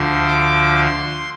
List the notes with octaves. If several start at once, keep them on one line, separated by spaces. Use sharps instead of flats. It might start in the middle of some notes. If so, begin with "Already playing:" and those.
Already playing: D2 D3 F3 C6
D6
C6